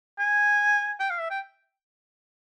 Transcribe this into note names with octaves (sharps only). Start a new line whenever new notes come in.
G#5
G5
F5
E5
G5